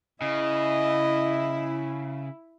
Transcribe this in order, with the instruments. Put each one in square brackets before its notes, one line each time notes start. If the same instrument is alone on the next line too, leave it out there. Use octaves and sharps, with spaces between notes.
[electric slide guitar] C#3 [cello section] E4 [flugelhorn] D#5